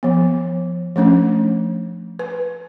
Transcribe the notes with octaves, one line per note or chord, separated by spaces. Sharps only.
F3 B3
F3 A3 C#4 D4
B4